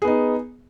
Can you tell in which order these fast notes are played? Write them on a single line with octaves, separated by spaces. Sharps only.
G#4 B3 D#4